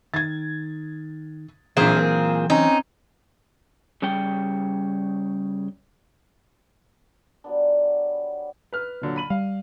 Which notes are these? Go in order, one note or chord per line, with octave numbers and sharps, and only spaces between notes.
D#3 G#6 A6
A#1 A#2 E3 F#3 C4 G#4 F5
A#4
C4 C#4 D#4
C#3 G3 C#5 G5
F#3 G3 B3 D4
B4 F6
A#2 D3 F#3
B5 D#7 F#7
G3 F5